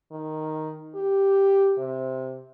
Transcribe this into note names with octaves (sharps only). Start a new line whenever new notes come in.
D#3
G4
C3